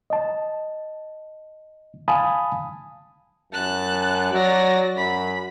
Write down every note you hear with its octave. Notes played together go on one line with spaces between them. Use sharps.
D#5 A5
F5 G#5 A5 B5 D#6
F#2 A5 F#6
F#3 D5 A#6
F#2 B5